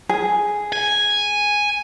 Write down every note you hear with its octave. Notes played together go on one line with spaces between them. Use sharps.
G#4
G#5